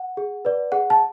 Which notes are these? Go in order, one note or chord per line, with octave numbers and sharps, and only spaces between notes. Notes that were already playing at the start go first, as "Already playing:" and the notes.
Already playing: F#5
G#4
B4 D5
G#4 F#5
A5